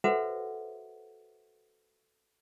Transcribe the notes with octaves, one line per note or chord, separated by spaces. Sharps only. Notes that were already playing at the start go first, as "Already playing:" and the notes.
F#4 A4 B4 C5 E5 F#5